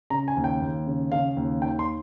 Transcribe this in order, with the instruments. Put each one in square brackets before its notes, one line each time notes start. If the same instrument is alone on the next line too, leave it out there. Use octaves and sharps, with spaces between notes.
[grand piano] C#3 A#5
G#5
D#2
G5
D#2
C#3
C#3 F5
D#2
D#3 G5
C6